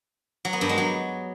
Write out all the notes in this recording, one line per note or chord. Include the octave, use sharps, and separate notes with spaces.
F#3
B3
G2
G#3
F#3